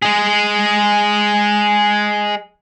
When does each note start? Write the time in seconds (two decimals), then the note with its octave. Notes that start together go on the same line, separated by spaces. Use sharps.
0.02 G#3 G#4